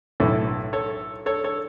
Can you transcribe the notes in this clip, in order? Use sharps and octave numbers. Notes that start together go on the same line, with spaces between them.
B1 A2 E3 E4 A4
A4 C#5
A4 C#5
A4 C#5